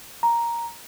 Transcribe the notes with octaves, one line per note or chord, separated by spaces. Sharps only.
A#5